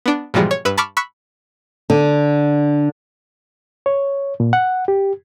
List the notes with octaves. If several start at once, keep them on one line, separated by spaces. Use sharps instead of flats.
B3 D4
G#2 B2 E3 F3 G3 G#3
C#5
G2 B4 B5 E6
A5 B5 C#6 D6 F6
B5 C#6 E6 F#6 B6 C#7
D3
C#5
A#2
F#5
G4